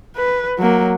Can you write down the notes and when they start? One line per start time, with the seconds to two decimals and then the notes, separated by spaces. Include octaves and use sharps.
0.17 B4
0.59 F#3 A#3